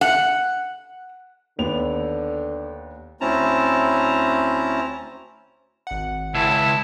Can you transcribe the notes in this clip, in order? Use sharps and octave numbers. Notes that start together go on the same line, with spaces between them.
F#5
D#2 D3 B3 F7
D2 C4 C#4 E4 A5 A#5
G#1 F#5
C#2 E4 A5